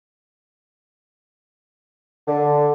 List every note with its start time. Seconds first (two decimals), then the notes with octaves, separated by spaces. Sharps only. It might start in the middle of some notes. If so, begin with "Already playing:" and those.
2.27 D3